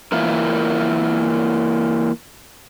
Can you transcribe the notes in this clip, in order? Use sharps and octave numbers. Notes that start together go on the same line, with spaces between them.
E3 A#3 E4 F4 A#4